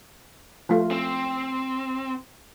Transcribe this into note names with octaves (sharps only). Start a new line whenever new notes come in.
F3 A3 F4
C4